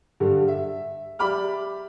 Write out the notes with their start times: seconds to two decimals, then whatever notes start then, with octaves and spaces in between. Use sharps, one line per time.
0.20 G2 D3 G3
0.48 E5
1.19 G4 D5 E5 B5 D6 F6